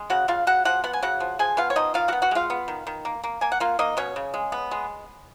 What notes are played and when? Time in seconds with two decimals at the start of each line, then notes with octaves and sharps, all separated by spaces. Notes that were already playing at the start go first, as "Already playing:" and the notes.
Already playing: G#3
0.10 C#3 F#4 F#5
0.28 C#3 F4 F5
0.47 C#3 F#4 F#5
0.65 F3 F#4 F#5
0.84 B3 F#5
0.93 G#5
1.02 C#3 F#4 F#5
1.20 F3
1.39 F3 G#4 G#5
1.57 B3 F4 F5
1.70 C#5
1.76 F3 D#4 D#5
1.94 D#3 F4 F5
2.08 F#4 F#5
2.13 B3
2.22 F#4 F#5
2.31 G#3 F4 F5
2.50 B3
2.68 D#3
2.87 D#3
3.05 A#3
3.23 A#3
3.41 A#3 G#5
3.52 F#5
3.60 A#3 F4 F5
3.79 A#3 D#4 D#5
3.97 B2 C#4 C#5
4.16 C#3
4.34 G#3
4.52 B3
4.71 G#3